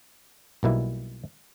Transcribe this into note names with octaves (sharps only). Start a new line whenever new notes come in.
B1 B2 G3 A#3 E4